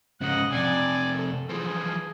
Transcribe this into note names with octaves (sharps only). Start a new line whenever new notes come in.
G#2 C#3 D#5 F#5
F2 C3 D5 G#5
A4
E3 F3 G#4